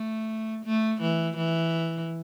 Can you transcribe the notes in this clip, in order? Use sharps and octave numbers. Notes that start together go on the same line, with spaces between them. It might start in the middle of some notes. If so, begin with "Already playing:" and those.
Already playing: A3
A3
E3
E3